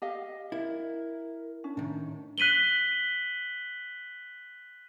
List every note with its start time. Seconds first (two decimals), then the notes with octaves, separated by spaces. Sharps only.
0.02 G4 D#5 F5
0.52 E4 A#4
1.64 C#4 D4
1.77 A2 D#3
2.38 F#6 B6 D#7 F#7 G7